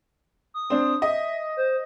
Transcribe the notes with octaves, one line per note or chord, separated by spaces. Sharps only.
D#6
C4 D4
D#5 E5
C5